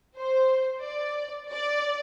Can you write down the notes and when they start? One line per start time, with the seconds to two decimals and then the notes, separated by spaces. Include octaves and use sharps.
0.16 C5
0.84 D5
1.52 D5